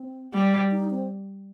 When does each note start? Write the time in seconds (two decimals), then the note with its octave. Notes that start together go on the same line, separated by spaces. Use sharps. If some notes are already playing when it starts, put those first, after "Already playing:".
Already playing: C4
0.34 G3
0.71 D#4
0.90 C4